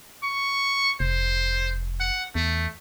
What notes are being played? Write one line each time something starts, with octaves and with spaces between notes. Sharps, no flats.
C#6
F1 C5
F#5
E2 A3